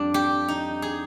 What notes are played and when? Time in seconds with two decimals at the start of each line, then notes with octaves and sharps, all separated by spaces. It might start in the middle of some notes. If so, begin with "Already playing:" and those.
Already playing: F2 G3 D4
0.14 G4
0.48 D#4
0.82 G#4